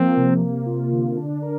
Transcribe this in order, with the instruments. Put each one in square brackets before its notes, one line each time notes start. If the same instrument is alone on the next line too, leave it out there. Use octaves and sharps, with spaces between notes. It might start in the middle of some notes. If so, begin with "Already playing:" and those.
Already playing: [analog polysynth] F3 A#3 [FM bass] C4
[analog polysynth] C3
A#3
F4
D3
D4
A#4